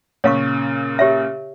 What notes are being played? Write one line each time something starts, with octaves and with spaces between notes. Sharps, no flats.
A#2 C#3 C#5 F5 C#6
G4 C#5 E5